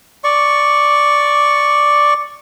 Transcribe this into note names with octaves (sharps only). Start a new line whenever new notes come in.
D5 C#6